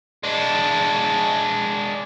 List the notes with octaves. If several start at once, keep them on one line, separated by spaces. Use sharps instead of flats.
G#3 D4